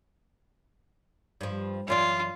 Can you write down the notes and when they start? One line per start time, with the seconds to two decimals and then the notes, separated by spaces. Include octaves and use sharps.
1.41 G2 F3
1.88 F#2 E3 F4 D5